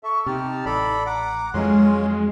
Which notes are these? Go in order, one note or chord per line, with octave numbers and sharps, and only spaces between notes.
A4 E5 C#6
C3 D#4 G4 A5 F6
A1 A4 D5 B5
F#5 A#5 D6
F2 E3 F#3 G#3 C#4 F4 C6